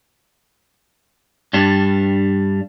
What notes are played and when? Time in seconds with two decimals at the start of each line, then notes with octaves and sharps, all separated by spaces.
1.53 G2 G3 D4